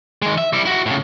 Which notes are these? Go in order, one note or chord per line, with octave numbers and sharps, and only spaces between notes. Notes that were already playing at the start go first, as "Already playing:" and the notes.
D#3 G#3
E5
G3 E4
E4 F#4
A2 C#3